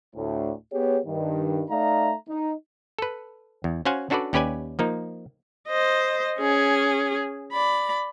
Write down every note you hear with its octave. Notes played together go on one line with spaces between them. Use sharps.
D2 A2
B3 G4 G#4 C#5
G2 D#3
A3 D#4 D5 E5 F5 A#5
D#4
A4 B4
E2
C#4 F#4 C5 F5 F#5 G#5
C#4 D4 F#4 A4 B4 D5
D#2 C#4 G4 B4 D5 G#5
F3 A#3 D#4
C5 D#5
C#4 G#4
D5 B5